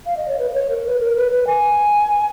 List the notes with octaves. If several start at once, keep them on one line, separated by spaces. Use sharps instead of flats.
F5
D#5
C#5
B4
B4
C#5
A#4
B4
A#4
B4
B4
G#5